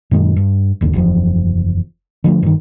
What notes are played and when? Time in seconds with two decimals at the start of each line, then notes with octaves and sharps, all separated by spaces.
0.11 F#2 A#2 D#3 G#3
0.36 G2
0.81 F#1 D#2 D3
0.93 F#1 E2 G#2 F3
2.24 D3 F3 G#3 A3
2.43 G2 D#3